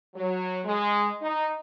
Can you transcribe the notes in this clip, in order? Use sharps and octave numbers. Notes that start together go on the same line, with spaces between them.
F#3
G#3
D#4